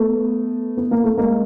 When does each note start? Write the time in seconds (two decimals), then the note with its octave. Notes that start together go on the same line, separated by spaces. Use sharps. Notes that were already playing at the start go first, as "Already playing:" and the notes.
Already playing: A3 B3
0.77 B3
0.91 A#3
1.04 A3
1.18 G#3 A#3